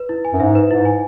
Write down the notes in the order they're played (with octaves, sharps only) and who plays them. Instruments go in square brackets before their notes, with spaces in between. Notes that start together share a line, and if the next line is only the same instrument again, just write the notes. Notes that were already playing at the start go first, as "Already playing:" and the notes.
Already playing: [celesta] B4
E4
G#5
[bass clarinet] F#2
[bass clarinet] G#2 [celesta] E5
[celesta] B4
[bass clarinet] G#2 [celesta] E4
[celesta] G#5